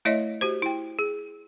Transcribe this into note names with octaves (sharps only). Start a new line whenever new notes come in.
A3 E4 C#5 D#5 E5
F#4 G4 C5
E4 G5
G#4